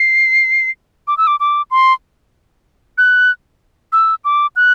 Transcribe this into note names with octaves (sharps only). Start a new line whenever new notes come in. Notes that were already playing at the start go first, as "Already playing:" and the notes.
Already playing: C7
D6
E6
D6
D6
C6
F#6
E6
D6
F#6